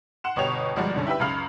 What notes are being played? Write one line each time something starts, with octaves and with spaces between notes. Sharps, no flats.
F#5 C6 E7
G1 B2 G4 C#5 F7
G1 F3 G3 G#3 F#4 D5
C#2 G2 D3 C#4
E4 G4 B4 E5
C#2 F#2 C#3 F5 B5 F7